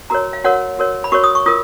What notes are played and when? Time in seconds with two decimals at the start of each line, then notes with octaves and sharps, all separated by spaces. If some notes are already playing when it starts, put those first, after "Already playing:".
0.10 F#4 A#4 C#5 A#5
0.33 F5
0.44 F#4 A#4 C#5 F#5
0.79 F#4 A#4 C#5
1.04 B5
1.12 F#4 A#4 C#5 C#6
1.24 D#6
1.35 C#6
1.46 F4 A#4 D#6